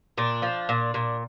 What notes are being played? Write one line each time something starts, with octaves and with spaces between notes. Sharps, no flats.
A#2 D4
F3
A#2
A#2